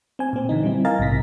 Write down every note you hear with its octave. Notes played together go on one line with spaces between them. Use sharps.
C4 G#5
A#2 C4
D3 E3 D#4
G3 C4 E4
A#4 D#5 F5 G#5 A#5 A6
A#1 G#2 C3 A#6 B6